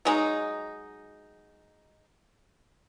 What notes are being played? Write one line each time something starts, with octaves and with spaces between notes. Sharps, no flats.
F#3 G#3 D#4